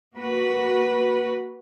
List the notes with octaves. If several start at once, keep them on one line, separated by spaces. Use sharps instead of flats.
A#3 F#4 B4